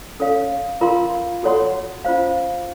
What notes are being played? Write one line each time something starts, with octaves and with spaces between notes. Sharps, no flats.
C#4 A4 C#5 F5
F4 A#4 F5 C6
F#4 A4 C#5 F#5 C6
C#4 F4 C5 F5